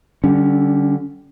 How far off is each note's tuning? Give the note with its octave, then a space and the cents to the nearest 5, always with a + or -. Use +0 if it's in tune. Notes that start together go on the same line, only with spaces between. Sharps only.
D3 +0 G3 -20 C#4 +20